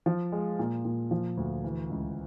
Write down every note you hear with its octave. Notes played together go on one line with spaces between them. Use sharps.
F3
G#3
A#2
A#2
F3
D2
E3
C#2